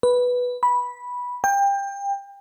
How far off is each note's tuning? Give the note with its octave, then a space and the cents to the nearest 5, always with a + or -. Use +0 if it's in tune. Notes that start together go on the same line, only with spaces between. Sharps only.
B4 -5
B5 -10
G5 +25